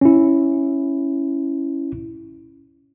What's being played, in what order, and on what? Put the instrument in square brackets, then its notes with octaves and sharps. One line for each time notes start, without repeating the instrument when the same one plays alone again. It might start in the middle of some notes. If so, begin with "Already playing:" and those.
[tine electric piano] C#4 E4